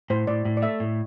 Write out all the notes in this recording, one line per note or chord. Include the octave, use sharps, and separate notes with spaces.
A2 C5
A2 D5
A2
D5
A3 E5
A2